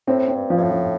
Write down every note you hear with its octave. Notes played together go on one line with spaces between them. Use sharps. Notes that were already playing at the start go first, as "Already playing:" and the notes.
A2 C4
C4
G2
F3
G2
A2
F3